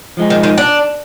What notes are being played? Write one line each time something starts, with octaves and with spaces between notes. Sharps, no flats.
F3 G#3 D#4 G#4
D#3
D#3
D4